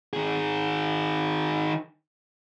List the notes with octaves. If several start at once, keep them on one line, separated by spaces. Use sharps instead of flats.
D#3 G#4